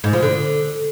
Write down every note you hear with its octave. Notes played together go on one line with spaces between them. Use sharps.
G#2
F3
D3